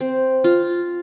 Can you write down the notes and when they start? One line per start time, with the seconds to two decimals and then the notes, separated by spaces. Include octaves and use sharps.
0.01 C4
0.44 F4